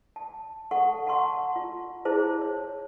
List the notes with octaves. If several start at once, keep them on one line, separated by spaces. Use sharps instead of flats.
A5
A4 F#5 A5 C#6
F#5 A5 A#5 C6 C#6
F4
E4 G#4 C5 A5
C#5